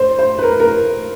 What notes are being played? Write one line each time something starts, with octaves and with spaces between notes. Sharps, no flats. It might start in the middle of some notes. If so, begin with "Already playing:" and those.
Already playing: C5
C5
B4
A#4
A#4